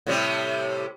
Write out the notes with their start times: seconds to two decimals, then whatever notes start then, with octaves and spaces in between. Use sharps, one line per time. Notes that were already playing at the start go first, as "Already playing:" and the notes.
0.07 A2 C3 G3